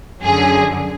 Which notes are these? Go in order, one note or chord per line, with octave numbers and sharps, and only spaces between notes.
F#2 D3 F#3 G#4